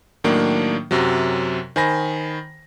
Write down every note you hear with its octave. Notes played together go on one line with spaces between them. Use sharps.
A2 D#3 F#3 A#3 D4
F#2 C3 F#3
D#3 C5 G#5 B5 A#6